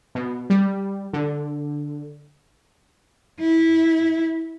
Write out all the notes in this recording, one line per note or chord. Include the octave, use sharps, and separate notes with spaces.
B2
G3
D3
E4